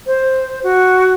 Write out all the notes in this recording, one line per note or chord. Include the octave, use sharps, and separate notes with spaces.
C5
F#4